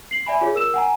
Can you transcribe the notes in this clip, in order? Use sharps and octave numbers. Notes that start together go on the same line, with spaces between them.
C7 F#7
D5 E5 G#5 B5
F4 G#4 C#5
A#4 E6 E7
F#5 G#5 A#5